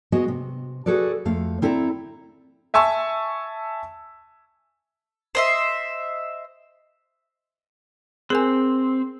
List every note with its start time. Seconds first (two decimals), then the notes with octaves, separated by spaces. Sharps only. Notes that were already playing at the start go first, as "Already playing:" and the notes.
0.12 G#3 B3 F#4 D#5
0.28 C3
0.86 F#4 G#4 A4 B4 D5
1.25 F2 A3 F5
1.62 C4 E4 A4 D5 G#5 A#5
2.74 E5 G#5 A5 C#6 E6
5.35 C5 D#5 E5
8.30 C4 G#4 A#4 G#5